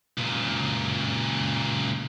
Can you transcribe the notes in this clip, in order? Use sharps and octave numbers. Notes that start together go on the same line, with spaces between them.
C#2 A#2